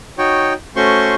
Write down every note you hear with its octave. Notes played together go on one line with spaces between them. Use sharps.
D#4 F#4 C#5 G5
A3 C#4 F#4 C5 C6 C#6